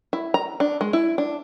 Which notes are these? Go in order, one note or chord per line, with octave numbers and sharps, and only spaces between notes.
E4
A#5
D4
G#3
E4
D4